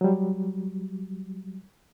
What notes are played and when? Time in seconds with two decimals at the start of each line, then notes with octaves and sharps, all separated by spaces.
0.01 F#3 G3